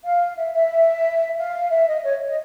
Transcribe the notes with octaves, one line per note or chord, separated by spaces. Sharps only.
F5
E5
E5
F5
E5
D#5
C#5
D#5